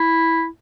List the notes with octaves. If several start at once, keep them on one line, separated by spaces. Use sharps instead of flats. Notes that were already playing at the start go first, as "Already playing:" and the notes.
Already playing: E4